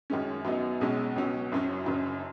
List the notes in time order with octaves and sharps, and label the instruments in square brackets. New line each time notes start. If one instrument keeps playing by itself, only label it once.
[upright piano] F#2 D#3 G#3 C#4
F#2 F#3 B3 D#4
B1 B2 G#3 C#4
C#2 B2 F#3 C#4
F#1 F#2 F#3 C#4
F#1 F#2 C#3